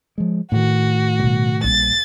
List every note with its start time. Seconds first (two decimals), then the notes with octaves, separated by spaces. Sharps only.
0.18 F3 G#3
0.52 A2 D#3 F#4
1.20 B2 G3
1.64 A#1 G3 A6